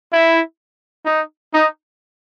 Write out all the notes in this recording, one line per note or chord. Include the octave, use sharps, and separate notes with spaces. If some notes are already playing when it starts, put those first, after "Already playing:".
E4
D#4
D#4